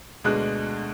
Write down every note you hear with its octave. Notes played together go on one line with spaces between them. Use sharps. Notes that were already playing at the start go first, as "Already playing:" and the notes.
D2 B2 G#3 D4 D#5 F#6